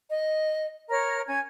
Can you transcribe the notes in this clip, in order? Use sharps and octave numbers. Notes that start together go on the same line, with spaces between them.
D#5
A#4 C#5 A#5 F6
C#4 G#5 G#6